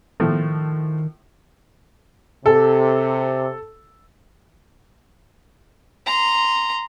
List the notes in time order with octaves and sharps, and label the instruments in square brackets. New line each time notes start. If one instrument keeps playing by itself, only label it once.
[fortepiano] A2 F3 A3 [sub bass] D#3
[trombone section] C3 [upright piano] A4
[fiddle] A#5 C6